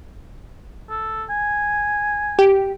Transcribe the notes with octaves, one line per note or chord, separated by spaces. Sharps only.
A4
G#5
G4